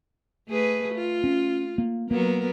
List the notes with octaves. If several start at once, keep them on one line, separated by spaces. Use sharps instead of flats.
A3 G#4 B4
F4
C#4
A#3
F#3 A#3 B3 A#4